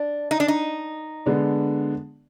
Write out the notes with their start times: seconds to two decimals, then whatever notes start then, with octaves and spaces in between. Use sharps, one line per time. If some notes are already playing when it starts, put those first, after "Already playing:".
Already playing: D4
0.31 D#4
0.40 D4
0.48 D#4
1.26 D3 G#3 B3 D4